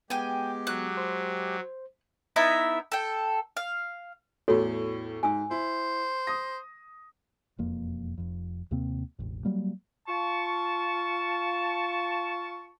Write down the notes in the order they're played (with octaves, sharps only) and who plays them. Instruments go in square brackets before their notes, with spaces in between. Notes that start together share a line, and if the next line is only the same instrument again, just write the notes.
[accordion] G#3 G4 [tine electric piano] B3 [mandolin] G5 G#5
[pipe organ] F#3 [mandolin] F#6
[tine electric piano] C5
[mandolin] B3 D#4 E4 E5
A4 G5
F5
[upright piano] E2 A2 [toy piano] F#4 A4 C#5
[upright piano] G#2 [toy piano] G#5 E6
[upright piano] E4 [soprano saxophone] C5
[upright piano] D#6 A#6
[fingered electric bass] E1 F2 A#3
F1 F2
D#2 C3 A#3 C4
E1 A1 E2
F#3 G3 A#3
[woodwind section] F4 A5 C#6